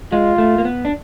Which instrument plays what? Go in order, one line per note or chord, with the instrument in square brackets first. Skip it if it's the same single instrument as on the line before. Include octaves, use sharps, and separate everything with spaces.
[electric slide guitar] G#3 [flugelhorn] F4
[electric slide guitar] A3
A#3
B3
D4